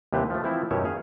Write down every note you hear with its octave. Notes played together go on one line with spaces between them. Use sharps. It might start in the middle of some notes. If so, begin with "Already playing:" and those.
D#2 C3 E3 G4 B4 C5
F3 A3
E3 F3 C4 E4
F#2 B2 D#3 G4 C#5 E5
G#4 F5